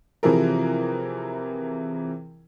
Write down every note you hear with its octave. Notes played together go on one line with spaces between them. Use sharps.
C3 E3 F3 E4 G#4 A#4